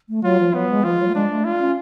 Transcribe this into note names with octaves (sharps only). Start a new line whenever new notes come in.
A3
F#3 F4
F3
F#3 B3
G#3
F3 F4
F#3
A3
G#3 D4
A3
F4
C#4